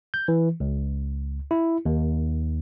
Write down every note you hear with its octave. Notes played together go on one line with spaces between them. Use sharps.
G6
E3
C#2
E4
D#2